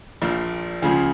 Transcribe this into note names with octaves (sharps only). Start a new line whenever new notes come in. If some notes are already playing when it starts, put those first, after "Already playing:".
A#1 A#2 F3 F4
C#2 C#3 F3 F4 G#4